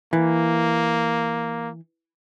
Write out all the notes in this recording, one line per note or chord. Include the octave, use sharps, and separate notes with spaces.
E3 A#3